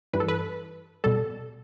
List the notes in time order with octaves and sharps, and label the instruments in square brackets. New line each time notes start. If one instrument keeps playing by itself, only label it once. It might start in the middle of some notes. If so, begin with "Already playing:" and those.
[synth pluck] G2 E3 G3 B4
A4
B4
B2 G3 A4